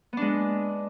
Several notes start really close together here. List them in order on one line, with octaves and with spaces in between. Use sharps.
B3 D4 G#3